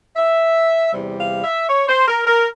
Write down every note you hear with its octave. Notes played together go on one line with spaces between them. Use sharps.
E5
E2 C3 G3
F5
E5
C#5
C5
A#4
A#4